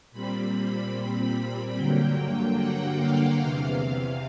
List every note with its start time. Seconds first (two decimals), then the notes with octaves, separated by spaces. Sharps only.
0.12 A#2 G3 C4 B5
1.76 G2 D3 F#3 A#3 G5
2.57 F#5
2.98 F5
3.39 E2 C3 E3 F5
3.80 F5